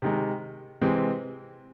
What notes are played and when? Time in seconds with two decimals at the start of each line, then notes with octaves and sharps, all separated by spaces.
0.02 C3 D#3 G#3
0.81 C3 E3 G#3 C4